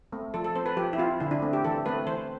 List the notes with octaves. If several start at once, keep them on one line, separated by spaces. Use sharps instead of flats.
A3 C4
F3 A4
A4
C4 C5
B4
F3 G4
E4
C4 F4
D3 E4
D4
A3 C4
G4
E3 A4
A3 C4 B4
E3 C5